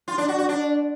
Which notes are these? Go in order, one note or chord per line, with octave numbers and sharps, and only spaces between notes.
F4
D4
F#4
F#4
D4